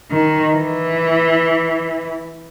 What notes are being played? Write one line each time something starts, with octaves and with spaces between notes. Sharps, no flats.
D#3
E3